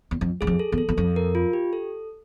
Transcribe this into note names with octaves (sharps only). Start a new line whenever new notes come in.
E2
F2
F#2 G#4
F2
A4
E2
A4
E2
F2 A4
A#4
F4
G4
A4